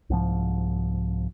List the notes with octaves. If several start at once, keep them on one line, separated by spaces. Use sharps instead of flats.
C2 G#2 F3